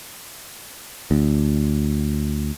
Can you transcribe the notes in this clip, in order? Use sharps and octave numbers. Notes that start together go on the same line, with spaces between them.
D2